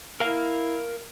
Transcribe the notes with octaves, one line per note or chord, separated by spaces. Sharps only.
E4 A#4 F5